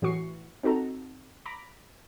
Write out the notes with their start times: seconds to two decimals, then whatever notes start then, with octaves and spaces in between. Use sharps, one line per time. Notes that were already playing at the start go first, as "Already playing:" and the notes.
0.02 A2 E3 F#4 C#6 C7
0.63 C4 D#4 F#4 A4 A#5
1.46 A#5 B5 D6